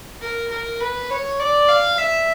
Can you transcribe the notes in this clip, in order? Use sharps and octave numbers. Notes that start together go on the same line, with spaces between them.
A#4
A#4
B4
C#5
D5
F5
E5